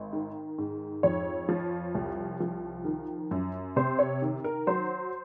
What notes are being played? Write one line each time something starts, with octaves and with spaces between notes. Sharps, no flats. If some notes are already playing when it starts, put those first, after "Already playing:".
Already playing: G#1
D#3
G#2
F2 C#5
F3
C2
F3
D#3
F#2
C3 C5
C#5
D#3
A#4
F#3 C5